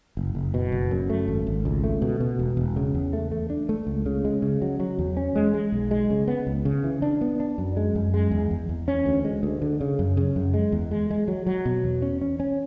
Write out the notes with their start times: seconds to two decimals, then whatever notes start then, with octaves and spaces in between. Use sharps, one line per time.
0.17 F#1
0.35 F#1
0.54 B2
0.72 F#1
0.91 F#2
1.10 A3
1.28 G#1
1.47 G#1
1.65 C#2
1.84 A3
2.02 B2
2.20 B2
2.39 E1
2.57 E1
2.76 C#3
2.95 E2
3.13 A3
3.31 A3
3.50 D4
3.69 A3
3.87 C#2
4.06 C#3
4.25 G#3
4.42 C#3
4.62 F#3
4.80 F#3
4.99 E2
5.17 C#4
5.36 G#3
5.54 G#3
5.72 B1
5.91 G#3
6.10 C#3
6.28 B3
6.47 C#2
6.65 C#3
6.84 E3
7.02 D4
7.21 B3
7.40 D4
7.58 F#2
7.77 G#3
7.95 F#2
8.14 G#3
8.31 E2
8.51 E2
8.69 E2
8.88 C#4
9.06 D2
9.25 G#3
9.43 D2
9.62 D3
9.81 C#3
9.99 F#2
10.17 C#3
10.36 F#2
10.54 G#3
10.72 E2
10.91 G#3
11.10 G#3
11.28 F#3
11.47 F#3
11.65 B2
11.84 E2
12.02 C#4
12.21 C#4
12.40 C#4